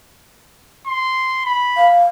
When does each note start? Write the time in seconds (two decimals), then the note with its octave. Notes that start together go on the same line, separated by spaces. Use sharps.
0.86 C6
1.45 B5
1.77 F5